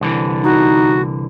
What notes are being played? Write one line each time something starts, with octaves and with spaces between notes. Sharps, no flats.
C2 D3 E3
D#4 F#4